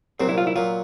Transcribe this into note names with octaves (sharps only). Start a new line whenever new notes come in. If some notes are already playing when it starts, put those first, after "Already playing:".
C2 A#2 F#3 C4
E4
F4
E4
A#2 F#3 F4